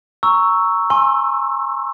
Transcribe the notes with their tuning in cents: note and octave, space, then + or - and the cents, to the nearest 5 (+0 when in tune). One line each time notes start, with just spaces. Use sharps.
A#5 +0 C#6 +0 E6 +0
G#5 +5 C6 +40 E6 +15